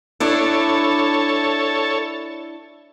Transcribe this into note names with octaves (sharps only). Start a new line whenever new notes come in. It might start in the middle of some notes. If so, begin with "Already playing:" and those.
D4 E4 A4 C#5